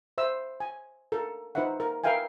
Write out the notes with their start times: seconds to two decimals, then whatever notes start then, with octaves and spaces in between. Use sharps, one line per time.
0.18 C5 E5 E6
0.60 G#5
1.12 A4 A#4
1.55 D#4 B4 C5 E5 F#5
1.80 A#4
2.04 A#4 B4 E5 F5 G5 G#5